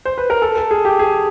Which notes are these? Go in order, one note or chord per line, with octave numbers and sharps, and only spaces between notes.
C5
B4
A#4
A4
A4
G#4
G4
G#4